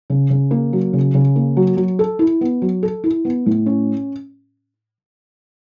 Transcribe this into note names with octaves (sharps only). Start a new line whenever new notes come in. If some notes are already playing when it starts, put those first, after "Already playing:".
C#3
C#3
A#3
F#3
C#3
C#3
A#3
F#3
F#3
A4
E4
B3
F#3
A4
E4
B3
A2
C#4